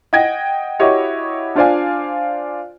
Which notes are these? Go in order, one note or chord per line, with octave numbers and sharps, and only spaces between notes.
D#5 F#5 G5 G#6 A#6
E4 F#4 G4 C#5 D#5
D4 F4 C5 D5 F5 G#5